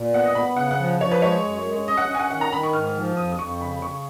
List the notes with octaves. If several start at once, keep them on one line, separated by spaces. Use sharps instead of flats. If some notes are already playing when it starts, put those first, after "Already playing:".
Already playing: A#2
B3 F#5
D#5
B3 B5
C#3 F#5
F#5
F3
F3 C#5
B4
G#3 C#5
F#2
G#3
C#4 D#5
F#5
C#4 D#5
G#5
F#5
D#3 F#5
A#5
D#3 B5
C#6
G#2 F6
F3
F2 D#6
D#6
F2 C#6
C#3 B5
C#3 C#6